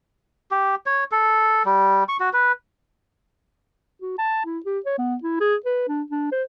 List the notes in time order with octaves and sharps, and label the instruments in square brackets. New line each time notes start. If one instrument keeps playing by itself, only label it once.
[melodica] G4
C#5
A4
G3
C#6
F#4
B4
[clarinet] F#4
A5
E4
G4
C#5
B3
E4
G#4
B4
D4
D4
C5